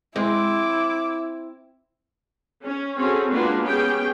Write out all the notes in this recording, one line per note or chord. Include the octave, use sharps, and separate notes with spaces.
G#3 C4 E4 D6
C#4
C4 C#4 F#4 G#4 A4
G#3 A#3 D4 F4 F#4 B4
B3 C#4 G4 G#4 G5